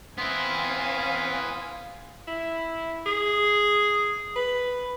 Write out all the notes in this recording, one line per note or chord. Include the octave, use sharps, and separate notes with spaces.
B3 C4 E4 F5 G#5 C6 D#6
E4
G#4
B4